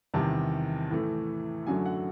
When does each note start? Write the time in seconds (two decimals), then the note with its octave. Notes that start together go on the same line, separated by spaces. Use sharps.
0.14 E2 C3 D#3 G3 A5
0.90 A2 E3 A3
1.67 F#2 D3 F#3 A3 G#5
1.86 F#5